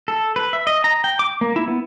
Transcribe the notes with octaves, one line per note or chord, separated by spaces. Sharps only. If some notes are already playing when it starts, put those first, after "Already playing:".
A4
B4
E5
D#5
A#5
G5
D6
A#3
E4
B3